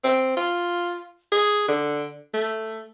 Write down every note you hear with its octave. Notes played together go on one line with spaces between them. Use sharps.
C4
F4
G#4
D3
A3